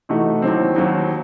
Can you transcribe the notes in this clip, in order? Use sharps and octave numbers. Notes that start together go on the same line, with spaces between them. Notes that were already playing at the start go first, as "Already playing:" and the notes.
C3 E3 A3 D#4 F#4
D#2 D#3 F#3 C4
D#2 D#3 F#3 C4